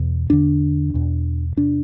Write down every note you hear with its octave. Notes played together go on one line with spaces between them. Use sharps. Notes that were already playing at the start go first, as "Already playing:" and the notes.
Already playing: E2 B2
E2 D3 D4
E2 B2
E2 C3 D4